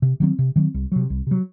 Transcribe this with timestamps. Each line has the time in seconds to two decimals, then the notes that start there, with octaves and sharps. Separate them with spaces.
0.02 C3
0.20 D#3 F#3 C4
0.39 C3
0.56 D#3 F#3 C4
0.74 C2
0.92 C3 F#3
1.10 C2
1.27 C3 F#3